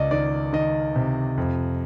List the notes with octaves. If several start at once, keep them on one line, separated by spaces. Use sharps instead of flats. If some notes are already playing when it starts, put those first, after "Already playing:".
Already playing: C#2 D5 D#5
D#3 D5
D#3 D#5
C3
F2